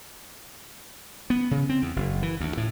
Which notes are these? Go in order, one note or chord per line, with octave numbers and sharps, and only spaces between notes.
B3
C#3
C4
E2
F#1
E3
D2
A2